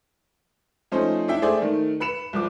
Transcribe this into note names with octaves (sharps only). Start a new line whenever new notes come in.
F3 A3 C#4 D#4 C5
D4 E4 E5 G5
A3 G#4 C5 D5 E5
D#3 A3
B4 B5 C#7 E7
C2 F3 D6